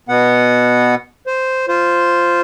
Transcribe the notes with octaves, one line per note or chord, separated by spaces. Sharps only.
B2 B3 F#5
C5
F4 C5